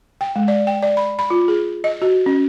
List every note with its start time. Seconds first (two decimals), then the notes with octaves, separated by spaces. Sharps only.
0.21 G5
0.36 G#3
0.48 D5
0.67 G5
0.82 D5
0.97 B5
1.19 B5
1.30 F4
1.48 G#4
1.84 D#5
2.02 F#4
2.26 C#4